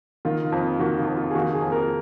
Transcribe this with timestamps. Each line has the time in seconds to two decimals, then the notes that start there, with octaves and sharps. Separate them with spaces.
0.25 D#3 F4
0.52 F2
0.80 D#3 F#4
0.98 F4
1.07 F2
1.17 F4
1.30 G#4
1.35 D#3 F#4
1.54 G#4
1.62 F2
1.72 A#4